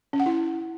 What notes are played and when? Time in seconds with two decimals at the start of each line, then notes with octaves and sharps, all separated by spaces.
0.13 C#4
0.20 F#5
0.26 E4